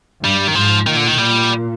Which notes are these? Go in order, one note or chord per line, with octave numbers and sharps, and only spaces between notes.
G2 G3
D#3
G#2 F3
A#2 D#3
D3
D#3
A#2 G3